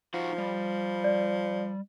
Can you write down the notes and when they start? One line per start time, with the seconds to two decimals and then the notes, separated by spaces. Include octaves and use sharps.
0.14 F3 D#4 F#4 F#5
0.38 G3
1.04 D5